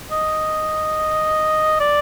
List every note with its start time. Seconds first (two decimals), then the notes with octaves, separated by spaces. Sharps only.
0.11 D#5
1.80 D5